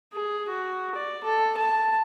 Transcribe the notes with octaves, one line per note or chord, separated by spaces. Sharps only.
G#4
F#4
D5
A4
A5